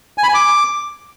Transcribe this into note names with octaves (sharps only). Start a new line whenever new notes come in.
G#5
B5
G#5
D6